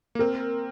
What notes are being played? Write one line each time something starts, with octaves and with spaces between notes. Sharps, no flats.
A#3
C4 A#4